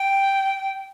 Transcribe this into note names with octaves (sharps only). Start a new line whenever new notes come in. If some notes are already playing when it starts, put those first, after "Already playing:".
Already playing: G5